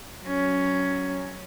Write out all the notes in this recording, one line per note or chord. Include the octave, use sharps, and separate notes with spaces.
F#3 C#4